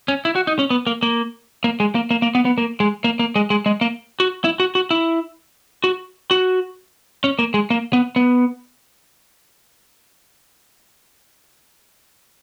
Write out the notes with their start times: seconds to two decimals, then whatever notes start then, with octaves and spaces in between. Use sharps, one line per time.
0.08 C#4
0.25 E4
0.35 F#4
0.47 D#4
0.59 C#4
0.70 B3
0.87 A#3
1.03 A#3
1.64 A#3
1.80 G#3
1.95 A#3
2.11 A#3
2.22 A#3
2.35 B3
2.45 B3
2.58 A#3
2.80 G#3
3.04 A#3
3.19 A#3
3.36 G#3
3.50 G#3
3.66 G#3
3.81 A#3
4.20 F#4
4.44 E4
4.60 F#4
4.75 F#4
4.91 E4
5.84 F#4
6.31 F#4
7.24 C#4
7.39 A#3
7.54 G#3
7.70 A#3
7.93 B3
8.16 B3